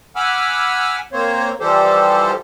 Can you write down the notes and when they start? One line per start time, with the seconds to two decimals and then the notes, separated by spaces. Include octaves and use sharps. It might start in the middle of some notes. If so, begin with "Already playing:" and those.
0.16 F#5 G#5 B5 D6 E6 F6
1.13 A#3 C4 C5 C#5
1.60 E3 F3 G3 G4 A4 C5